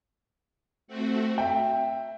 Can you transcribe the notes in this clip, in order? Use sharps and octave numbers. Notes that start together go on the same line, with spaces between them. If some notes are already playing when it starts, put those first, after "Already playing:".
A3 C4 F#4
E5 G5